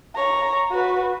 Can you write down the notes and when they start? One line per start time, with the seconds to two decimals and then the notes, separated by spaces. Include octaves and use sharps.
0.15 C#5 A#5
0.71 F#4 B4